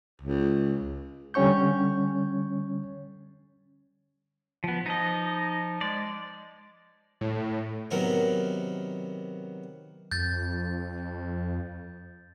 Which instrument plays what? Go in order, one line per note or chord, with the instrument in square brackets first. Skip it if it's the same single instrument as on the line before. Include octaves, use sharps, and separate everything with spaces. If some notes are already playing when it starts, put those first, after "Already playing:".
[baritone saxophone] C#2
[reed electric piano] D3 G3 C#4 C#5 C#6 G6
[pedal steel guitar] F3 B3
[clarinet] F3 [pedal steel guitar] D#4 D#5
[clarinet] G#3 [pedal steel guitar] D5
[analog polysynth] A2
[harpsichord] C3 D#3 F#3 B3 A#4
[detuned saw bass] F2 [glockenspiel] G6 A6